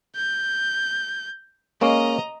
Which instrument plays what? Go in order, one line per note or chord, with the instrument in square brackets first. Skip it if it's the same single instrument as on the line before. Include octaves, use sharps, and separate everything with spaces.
[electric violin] G6
[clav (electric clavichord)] G#3 A#3 C#4 [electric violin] D#5 A#5